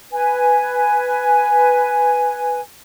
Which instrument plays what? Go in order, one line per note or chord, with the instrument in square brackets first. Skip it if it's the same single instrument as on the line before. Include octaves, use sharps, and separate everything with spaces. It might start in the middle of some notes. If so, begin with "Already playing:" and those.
[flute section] B4 G#5